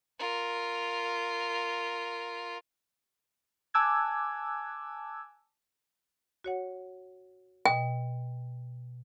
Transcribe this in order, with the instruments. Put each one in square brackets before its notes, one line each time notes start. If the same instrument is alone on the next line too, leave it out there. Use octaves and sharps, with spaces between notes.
[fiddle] F4 A#4
[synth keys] G#5 A5 D6 E6 F#6 G#6
[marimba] F#4 C#5 F#5
[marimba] B2 D#5 A#6 [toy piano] G5